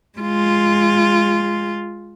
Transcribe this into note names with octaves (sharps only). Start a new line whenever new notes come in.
G#3 F4